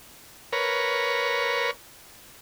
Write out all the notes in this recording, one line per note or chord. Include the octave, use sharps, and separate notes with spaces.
A#4 B4 C#5